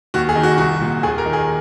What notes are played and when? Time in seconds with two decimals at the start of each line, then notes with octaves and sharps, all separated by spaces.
0.14 D#2 F#4
0.29 G#4
0.35 D#3
0.43 F#4
0.58 C2 F#4
0.81 A#2
1.03 D#2 G#4
1.18 A#4
1.26 D#3
1.33 G#4